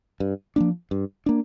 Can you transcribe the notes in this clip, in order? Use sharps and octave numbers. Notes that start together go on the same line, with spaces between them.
G2
F3 A#3 D4
G2
A#3 D4